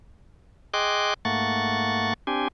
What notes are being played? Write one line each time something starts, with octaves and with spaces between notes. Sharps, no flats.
G#4 D#5 G5 C6 D6 F#6
G#2 A3 A#3 F#5 C#6 A6
C4 D4 G4 G#5